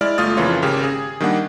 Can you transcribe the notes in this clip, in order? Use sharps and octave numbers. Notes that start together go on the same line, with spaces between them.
G#3 E4 D5 F6
G1 A3 F4 D#6 F6 A6
F2 C#3 E3 A#3 F4 C#5
G#1 C#3 G4 A#4
G#4
D#3 G3 A#3 D4 F#5